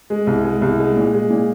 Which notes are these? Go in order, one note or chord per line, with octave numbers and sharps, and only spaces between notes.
G#3
C2
G#3
C2
G#3
A#2
G#3
A#2